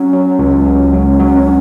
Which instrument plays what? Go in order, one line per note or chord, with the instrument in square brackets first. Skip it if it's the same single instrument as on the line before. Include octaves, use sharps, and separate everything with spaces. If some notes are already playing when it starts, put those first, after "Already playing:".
Already playing: [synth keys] F#3 [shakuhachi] C#4
[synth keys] F#3
C#2
F#3
F#3
F#3